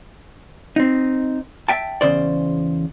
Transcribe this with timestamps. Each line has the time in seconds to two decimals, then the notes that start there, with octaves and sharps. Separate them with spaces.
0.76 C4 D#4
1.68 E5 G5 A5
2.01 E2 C#3 C5 D5